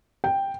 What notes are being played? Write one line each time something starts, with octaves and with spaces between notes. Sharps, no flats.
G5